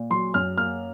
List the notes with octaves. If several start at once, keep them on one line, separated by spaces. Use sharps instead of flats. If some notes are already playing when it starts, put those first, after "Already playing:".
Already playing: A#2
F#3 C6
F#2 F6
A#3 F6